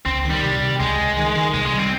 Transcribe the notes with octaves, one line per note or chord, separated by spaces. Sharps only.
C#2 C4
D#3
G3
C3
C3
C#2 G#3
C#2
D#3
D#3
C2 G#3
G#3
G3
C4